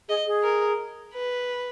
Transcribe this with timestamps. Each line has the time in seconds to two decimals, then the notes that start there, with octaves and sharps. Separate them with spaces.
0.09 G#4 D#5
0.26 G#4
0.43 A#4
1.14 B4